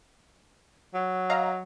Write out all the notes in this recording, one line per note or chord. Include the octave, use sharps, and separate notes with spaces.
F#3
D#5 F5 A#5